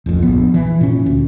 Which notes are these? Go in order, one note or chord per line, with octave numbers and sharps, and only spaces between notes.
D1 A1 F2
A#1 B3
E3
A#2 C#4
D2